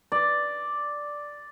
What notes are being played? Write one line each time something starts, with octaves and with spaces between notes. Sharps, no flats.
D5